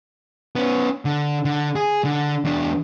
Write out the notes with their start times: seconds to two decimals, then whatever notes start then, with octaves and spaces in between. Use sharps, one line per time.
0.56 B3 C#4
1.05 D3
1.45 D3
1.76 G#4
2.05 D3
2.45 E2 D4